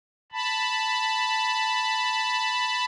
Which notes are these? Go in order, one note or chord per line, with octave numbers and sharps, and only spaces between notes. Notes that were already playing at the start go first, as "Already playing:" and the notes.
A5 B5